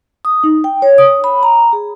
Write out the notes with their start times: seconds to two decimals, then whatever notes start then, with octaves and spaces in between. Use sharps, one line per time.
0.25 D#6
0.44 D#4
0.64 G5
0.82 C#5
0.98 D#6
1.24 B5
1.43 A#5
1.73 G#4